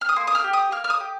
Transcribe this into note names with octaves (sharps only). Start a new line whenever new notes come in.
F6
D#6
A#3 C6
D#6
F6
G4
D#6
A#3 F6
F6
D#6
G4